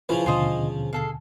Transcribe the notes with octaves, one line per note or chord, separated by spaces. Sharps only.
C#3 F3 E4 F4 B4 C#5
D#2 B2 D3 F4 C5 D#5
G#4 A4 F5